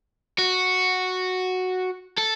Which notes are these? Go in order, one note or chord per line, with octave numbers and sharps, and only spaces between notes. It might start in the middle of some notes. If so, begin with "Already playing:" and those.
F#4
A4